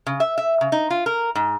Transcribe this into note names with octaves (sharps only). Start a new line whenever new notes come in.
C#3
E5
E5
C#3
D#4
F4
A#4
G#2